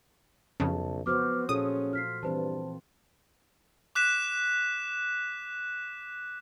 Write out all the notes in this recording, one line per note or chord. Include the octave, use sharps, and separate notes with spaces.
B1 F2 C#3 A5
F3 B3 F#4 C5 D6 F6
A#2 C#4 F4 G#4 A4 D#6
F4 F6 B6 C7
G2 E3 C4 B4 C5 A5
D6 F#6 B6 E7